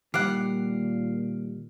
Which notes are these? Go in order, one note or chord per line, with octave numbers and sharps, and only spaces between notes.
A#2 D#3 G3 G4 F#5 F6 C7 D7